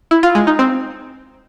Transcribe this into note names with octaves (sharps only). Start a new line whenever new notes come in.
E4
F4
G#3
D#4
C4